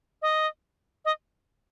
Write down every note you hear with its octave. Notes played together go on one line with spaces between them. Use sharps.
D#5
D#5